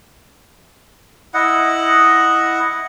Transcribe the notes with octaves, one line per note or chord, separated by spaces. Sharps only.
E4 D#5 F#5